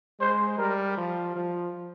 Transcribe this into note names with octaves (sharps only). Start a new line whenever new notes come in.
G#3 C5
G3 A#4
F3
F3